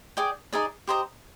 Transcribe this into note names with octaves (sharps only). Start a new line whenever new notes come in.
G#4 D5 G5 D6
D#4 G#4 D5
G4 C5 D#5 A#5